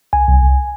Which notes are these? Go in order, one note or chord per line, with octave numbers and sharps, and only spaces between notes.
C2 G#5
C2
C2